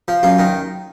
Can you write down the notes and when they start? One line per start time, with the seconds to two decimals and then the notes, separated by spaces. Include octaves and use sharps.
0.08 F3
0.23 F#2 F4
0.39 D#3